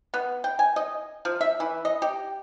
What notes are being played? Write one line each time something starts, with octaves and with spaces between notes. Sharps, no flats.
B3
G5
G#5
D#5
F3
E5
E3
D#5
G4